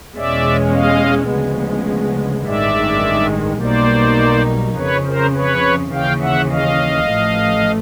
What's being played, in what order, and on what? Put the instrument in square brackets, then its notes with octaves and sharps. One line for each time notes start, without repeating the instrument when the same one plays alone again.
[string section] E2 B2 G#3 C#4 [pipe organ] D5 E5
[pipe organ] D#5 F5
[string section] D2 C#3 F3 G#3 B3
[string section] A1 G2 D#3 G#3 [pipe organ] D5 E5
[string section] B1 B2 G3 A#3 D#4 [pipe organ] C5 D5
[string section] F2 C#3 F3 [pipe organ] B4 C#5
[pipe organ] A#4 C5
B4 C#5
[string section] D#2 C#3 E3 [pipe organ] F5 G5
[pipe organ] E5 F#5
D#5 F5
[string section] A1 A2 F3 A3